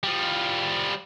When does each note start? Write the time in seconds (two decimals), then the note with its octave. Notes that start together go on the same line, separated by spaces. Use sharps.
0.03 F3 G3